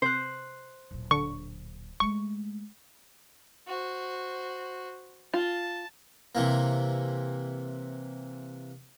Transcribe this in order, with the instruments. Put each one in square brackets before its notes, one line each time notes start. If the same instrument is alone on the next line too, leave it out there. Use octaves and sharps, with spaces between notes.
[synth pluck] C3 [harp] C5 F#6
[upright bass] D1 A#2
[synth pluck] D3 [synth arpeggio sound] C#6
[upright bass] G#3 A3 [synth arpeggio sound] C#6
[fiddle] F#4 C5
[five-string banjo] F4 [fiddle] A5
[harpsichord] C3 E3 A#3